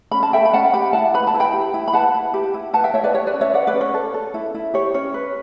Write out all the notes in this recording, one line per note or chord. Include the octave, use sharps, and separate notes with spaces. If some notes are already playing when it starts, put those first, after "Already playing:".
C#4 B5
A5
A4 E5 G5
B5
C#4 F#5 A5
G4 G5 B5
E4 F#5 A5
B4 B5
A5
E4
G5 B5
G4
E4
B5
B4 F#5 A5
E4
G4
E4
B4 F#5 A5
E5 G5
E4 C#5 E5
B4 D5
G4 C#5
B4 D5
C#4
C#5 E5
B4 D5 F#5
B4 D5
C#4
C#5
A4
A4
E4
E4
G4 C#5
C#4 C#5
B4